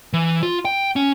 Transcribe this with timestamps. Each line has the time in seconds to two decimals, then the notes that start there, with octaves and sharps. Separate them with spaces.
0.13 E3
0.43 F4
0.65 G5
0.96 C#4